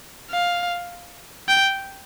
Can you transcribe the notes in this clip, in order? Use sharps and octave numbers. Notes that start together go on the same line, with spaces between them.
F5
G5